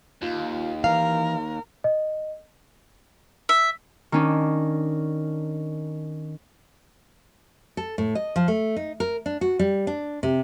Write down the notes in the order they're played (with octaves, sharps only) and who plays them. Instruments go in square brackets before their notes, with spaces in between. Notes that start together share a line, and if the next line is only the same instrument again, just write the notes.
[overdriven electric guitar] D#2 [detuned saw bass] F4
[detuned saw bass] E3 [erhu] A#4 [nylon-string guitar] F5
[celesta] D#5
[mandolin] E5
[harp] D#3 C#4 D4
[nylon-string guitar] A4
A2
D#5
F3
A3
D#4
A#4
D4
F#4
G3
D4
C3